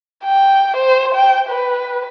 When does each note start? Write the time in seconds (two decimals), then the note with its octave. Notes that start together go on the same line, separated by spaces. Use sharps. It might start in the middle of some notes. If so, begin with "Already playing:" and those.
0.24 G5
0.77 C5
1.14 G5
1.49 B4